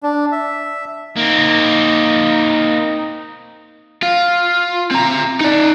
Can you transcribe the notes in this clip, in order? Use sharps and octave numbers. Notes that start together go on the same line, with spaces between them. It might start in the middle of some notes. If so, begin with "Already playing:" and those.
D4
E5
A#3 C4 D#4
F4
C4 A#5
D#4 D5